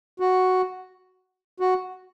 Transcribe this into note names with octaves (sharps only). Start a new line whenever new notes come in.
F#4
F#4